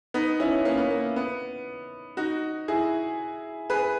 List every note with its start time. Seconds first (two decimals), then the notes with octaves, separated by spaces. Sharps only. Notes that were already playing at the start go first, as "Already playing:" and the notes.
0.14 B3 D#4
0.40 C#4 E4
0.65 A#3 C#4
0.78 B3
0.90 A#3
1.16 B3
2.17 D#4 F#4
2.68 E4 G#4
3.70 G#4 B4